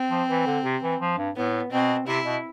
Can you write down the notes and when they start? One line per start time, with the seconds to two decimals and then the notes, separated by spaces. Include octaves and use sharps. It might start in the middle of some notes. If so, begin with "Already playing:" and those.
Already playing: C4
0.10 F3
0.29 E3
0.46 D3
0.64 C3
0.83 E3
1.01 F3
1.18 G2
1.36 A2 B3
1.72 B2 C4
2.07 C3 E4
2.25 B2